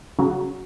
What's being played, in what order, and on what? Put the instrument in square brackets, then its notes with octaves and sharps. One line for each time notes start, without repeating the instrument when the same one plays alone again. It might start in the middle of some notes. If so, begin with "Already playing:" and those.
[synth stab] C#3 F#3